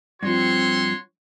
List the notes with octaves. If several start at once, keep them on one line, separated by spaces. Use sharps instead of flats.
G2 F3 C4 F#4 C#5 C6